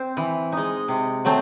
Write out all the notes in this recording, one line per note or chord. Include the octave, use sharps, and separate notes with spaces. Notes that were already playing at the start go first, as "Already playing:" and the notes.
Already playing: C4
E3
G#3 D#4
C3
F#3 A3 C4